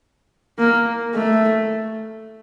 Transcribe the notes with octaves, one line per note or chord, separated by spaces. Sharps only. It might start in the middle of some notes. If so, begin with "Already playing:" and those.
A#3
A3